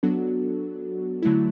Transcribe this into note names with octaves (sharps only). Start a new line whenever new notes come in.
F#3 B3 D4 F#4 A4
D3 F#3 A3 E4